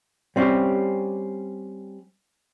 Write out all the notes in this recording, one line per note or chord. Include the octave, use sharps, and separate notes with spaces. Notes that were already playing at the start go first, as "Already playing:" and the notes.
G3 C4 C#4 G4